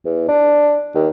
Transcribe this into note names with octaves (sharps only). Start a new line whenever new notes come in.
E2
D4
D#2